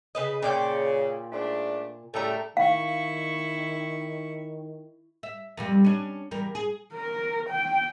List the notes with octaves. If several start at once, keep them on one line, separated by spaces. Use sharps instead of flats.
C#3 B4 D#5
A#2 C#3 D5 G5
G#2 A3 D4
A2 C#3 G3 A3 G5 A#5
D#3 E4 F5 C#6
E5
F2 A#2 G3
C#4 D4
E2 G3 A#4
G#4
A#4
G5